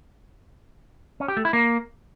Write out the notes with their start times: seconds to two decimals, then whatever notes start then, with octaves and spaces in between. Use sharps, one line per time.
1.20 C#4
1.28 G4
1.37 A3
1.45 E4
1.53 A#3